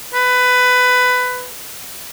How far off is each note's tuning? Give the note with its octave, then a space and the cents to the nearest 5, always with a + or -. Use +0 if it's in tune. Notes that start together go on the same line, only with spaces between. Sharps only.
B4 +15